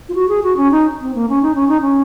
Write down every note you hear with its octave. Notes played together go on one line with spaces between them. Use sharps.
F4
F#4
G#4
F#4
C#4
D#4
C4
A#3
C#4
D#4
C#4
D#4
C#4